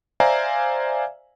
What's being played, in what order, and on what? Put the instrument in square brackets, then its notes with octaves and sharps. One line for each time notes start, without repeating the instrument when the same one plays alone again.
[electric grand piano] C5 D5 E5 F5 G#5 A#5